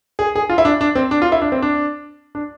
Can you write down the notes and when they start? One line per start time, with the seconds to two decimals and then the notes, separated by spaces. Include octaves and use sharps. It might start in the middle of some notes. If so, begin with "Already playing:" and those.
0.19 G#4
0.36 G#4
0.50 F4
0.58 E4
0.65 D4
0.81 D4
0.95 C4
1.11 D4
1.22 F4
1.32 E4
1.42 D4
1.52 C4
1.62 D4
2.35 D4